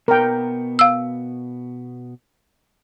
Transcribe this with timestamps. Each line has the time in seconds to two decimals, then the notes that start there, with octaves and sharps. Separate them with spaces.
0.08 B2 B3 A#4 G5
0.79 F5 E6